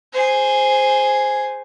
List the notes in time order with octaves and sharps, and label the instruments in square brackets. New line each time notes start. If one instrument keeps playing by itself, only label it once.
[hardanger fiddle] G#4 C5